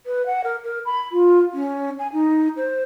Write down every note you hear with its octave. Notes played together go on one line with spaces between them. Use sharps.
B4
F#5
A#4
A#4
B5
F4
C#4
G#5
D#4
C5